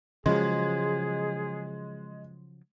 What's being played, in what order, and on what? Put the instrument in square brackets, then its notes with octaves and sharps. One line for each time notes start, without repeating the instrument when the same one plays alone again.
[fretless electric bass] C#3 F3 F#3 [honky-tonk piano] G#3 [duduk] G#4